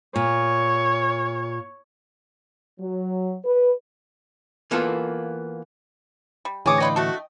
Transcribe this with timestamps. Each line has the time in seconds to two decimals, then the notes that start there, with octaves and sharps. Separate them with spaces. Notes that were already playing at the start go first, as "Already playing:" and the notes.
0.16 A#2 C#5
2.80 F#3
3.44 B4
4.71 E3 A#3 B3 F4 A4
6.45 G3
6.66 A2 D3 E3 C4 G#4 C#5 D6 D#6
6.80 F4 B4 D5 D#5 G5
6.96 A3 D4 F#4 A4